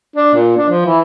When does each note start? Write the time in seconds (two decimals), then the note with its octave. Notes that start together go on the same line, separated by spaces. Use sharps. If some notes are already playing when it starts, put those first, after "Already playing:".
0.16 D4
0.34 A#2
0.57 D4
0.69 F3
0.85 E3